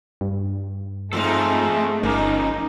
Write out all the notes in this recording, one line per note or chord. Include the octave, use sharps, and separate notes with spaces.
G2
F2 G#2 A3 C4 D#4 F4 A4
G1 F3 A#3 C#4 D#4 F4